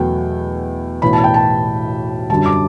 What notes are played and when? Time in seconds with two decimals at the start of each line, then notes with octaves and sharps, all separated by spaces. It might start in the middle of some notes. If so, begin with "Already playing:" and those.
Already playing: E2 B2 F#3 A3 G5
1.02 B1 A2 E3 B5
1.13 A5
1.24 G5
1.34 A5
2.30 F#2 D3 G3 A5
2.46 D6